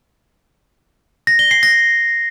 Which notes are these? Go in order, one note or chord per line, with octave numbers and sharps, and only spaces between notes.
A#6
G7
C7
A#6